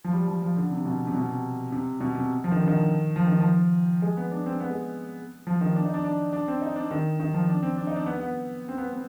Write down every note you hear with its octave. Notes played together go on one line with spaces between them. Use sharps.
F3
G3
F3
F3
D3
C3
B2
C3
B2
C3
C3
B2
C3
F3
D#3
D3
D#3
F3
D#3
F3
G#3
B3
D4
C4
B3
G#3
F3
D#3
D4
D#4
D4
D4
D4
C4
D#4
D4
D#3
D#3
F3
D4
C4
D4
D#4
D4
B3
B3
C4
B3
B3